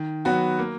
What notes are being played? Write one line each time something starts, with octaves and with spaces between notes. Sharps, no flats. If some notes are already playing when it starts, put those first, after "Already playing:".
Already playing: D#3
F#3 B3 F#4
A#3